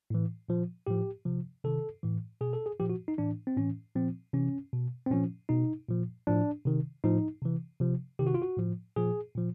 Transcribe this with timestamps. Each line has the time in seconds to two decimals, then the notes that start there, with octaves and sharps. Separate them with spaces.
0.10 A2 E3
0.49 A#2 F3
0.87 A2 F3 G4
1.26 C3 F3
1.64 C3 D#3 A4
2.03 A2 E3
2.41 B2 G#4
2.53 A4
2.66 G#4
2.80 A#2 F3 G4
2.90 F#4
3.08 D#4
3.18 A2 E3 D4
3.47 C4
3.57 A2 E3 C#4
3.95 A#2 F3 C4
4.33 C3 E3 C#4
4.73 B2
5.07 C4
5.10 A#2 F3 C#4
5.49 B2 D#4
5.89 A#2 F3
6.27 A2 F3 D4
6.66 C3 D#3
7.04 A2 F3 D#4
7.42 C3 E3
7.80 C3 F3
8.19 C3 D#3 G4
8.27 F#4
8.34 F4
8.42 F#4
8.57 A2 F3
8.96 A#2 F3 G#4
9.35 A#2 F3